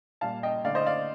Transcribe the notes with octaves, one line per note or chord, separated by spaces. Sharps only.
A#2 G3 F5 A5
D#5 G5
D3 A3 D5 F5
C5 D#5
D5 F5